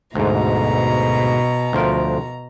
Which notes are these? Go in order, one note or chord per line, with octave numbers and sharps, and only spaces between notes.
D2 G#2 B2 A#5
D2 F3 A#4